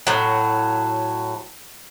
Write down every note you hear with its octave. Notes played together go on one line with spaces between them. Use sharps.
A2 F#3